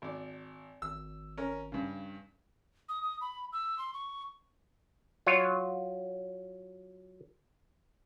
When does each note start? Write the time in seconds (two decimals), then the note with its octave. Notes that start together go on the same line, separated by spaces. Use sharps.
0.02 G#1 D5
0.82 G#1 E6
1.38 C#4 A#4
1.72 G2 C#3
2.89 D#6
3.03 D#6
3.21 B5
3.53 E6
3.79 C6
3.94 C#6
5.27 F#3 F4 C#5